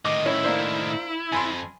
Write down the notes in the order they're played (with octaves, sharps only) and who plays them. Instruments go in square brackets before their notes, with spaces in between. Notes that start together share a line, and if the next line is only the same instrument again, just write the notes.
[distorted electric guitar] A2 D#3 [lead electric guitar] D#5 [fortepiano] D6
[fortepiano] C#4 [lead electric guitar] E4
[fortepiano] A#3 D4 C5
[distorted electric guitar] F2 [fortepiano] G#5 B5 C6